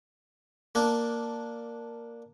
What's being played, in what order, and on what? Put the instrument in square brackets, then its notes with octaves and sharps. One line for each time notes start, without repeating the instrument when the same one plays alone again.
[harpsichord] A#3 D4